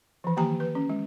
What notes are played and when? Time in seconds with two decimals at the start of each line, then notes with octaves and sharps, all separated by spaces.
0.24 E3 F3
0.37 D#3 A#3 G4 G#5 A#5
0.60 B4
0.75 C#4
0.89 G#3